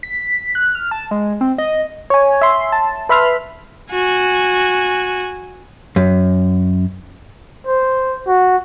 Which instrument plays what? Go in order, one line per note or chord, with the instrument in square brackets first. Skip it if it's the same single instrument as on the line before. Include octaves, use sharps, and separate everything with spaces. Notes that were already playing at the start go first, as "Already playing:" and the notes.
[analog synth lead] B6
F#6
F6
A5
G#3
C4
D#5
[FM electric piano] C#5 G#5
E5 C6
A5
B4 E5 B5 C6 F6
[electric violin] F#4 G#5
[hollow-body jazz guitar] F#2
[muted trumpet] C5
F#4